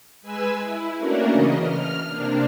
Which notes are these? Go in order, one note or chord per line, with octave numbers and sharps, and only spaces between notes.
G#3 B4 G#5 E6
E4
A3 A#3 C#4 D4 F#4 A#4
C#3 E3 D#5
F6
C3 A#3 D4